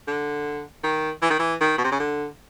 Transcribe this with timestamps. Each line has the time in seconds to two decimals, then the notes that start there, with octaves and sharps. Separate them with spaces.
0.07 D3
0.84 D#3
1.22 E3
1.30 D#3
1.39 E3
1.61 D#3
1.78 B2
1.84 C3
1.92 C#3
2.00 D3